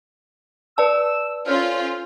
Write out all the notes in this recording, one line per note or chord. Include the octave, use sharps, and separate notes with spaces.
B4 D5 A5 E6
C#4 F4 A4 C5 F6